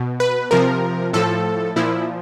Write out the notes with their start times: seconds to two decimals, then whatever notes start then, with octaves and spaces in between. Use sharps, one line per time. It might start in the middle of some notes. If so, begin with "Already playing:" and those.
Already playing: B2
0.20 B4
0.51 C3 F3 A#4
1.13 A2 F3 A4
1.76 A#2 F3 E4